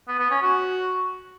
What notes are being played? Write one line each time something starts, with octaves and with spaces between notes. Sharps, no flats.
B3
B3
C#4
F#4